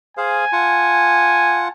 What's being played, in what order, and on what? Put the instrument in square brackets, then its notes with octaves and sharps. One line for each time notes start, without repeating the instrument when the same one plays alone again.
[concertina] G#4 C5 F5 [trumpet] G#5
[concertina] F4 F#5 A5